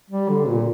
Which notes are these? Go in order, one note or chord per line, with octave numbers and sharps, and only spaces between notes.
G3
D3
A#2